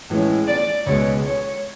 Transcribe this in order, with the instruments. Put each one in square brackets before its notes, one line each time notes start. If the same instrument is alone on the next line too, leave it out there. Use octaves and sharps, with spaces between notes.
[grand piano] A2 E3 G#3 C#4
[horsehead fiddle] D5
[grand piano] C#2 B2 G#3 B3 [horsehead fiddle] C#5
[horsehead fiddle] C#5